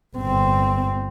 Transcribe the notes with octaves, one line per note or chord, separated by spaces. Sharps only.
G1 C4